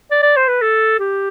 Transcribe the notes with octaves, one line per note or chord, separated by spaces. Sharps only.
D5
D5
C5
B4
A4
G4